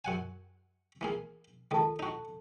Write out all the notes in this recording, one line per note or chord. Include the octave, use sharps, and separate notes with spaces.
F#2 F#5 G#5
E3 A#3 G#4
C#2 D#3 A4 A5
D#4 F#4